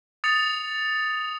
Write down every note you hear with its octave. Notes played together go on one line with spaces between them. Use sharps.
D#6 A6 C#7 F7